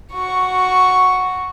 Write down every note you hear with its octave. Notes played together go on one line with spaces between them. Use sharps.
F#4 C#6